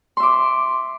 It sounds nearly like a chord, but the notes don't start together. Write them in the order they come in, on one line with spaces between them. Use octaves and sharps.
C6 E5 D6